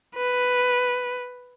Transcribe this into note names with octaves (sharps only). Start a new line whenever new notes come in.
B4